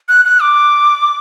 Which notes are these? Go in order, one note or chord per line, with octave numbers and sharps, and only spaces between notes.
F#6
F#6
D6